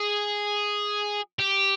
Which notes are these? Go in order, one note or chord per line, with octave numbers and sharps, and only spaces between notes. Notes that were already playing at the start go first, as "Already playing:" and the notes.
Already playing: G#4
G4